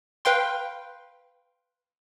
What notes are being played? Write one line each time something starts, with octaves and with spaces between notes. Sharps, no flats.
B4 F5 G5 C6